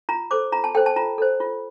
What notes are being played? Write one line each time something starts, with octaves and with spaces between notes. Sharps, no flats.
F4 A#5
A4 C5 D6
F4 A#5
A5
A4 C5 G5
A5
F4 A#5
A4 C5
F4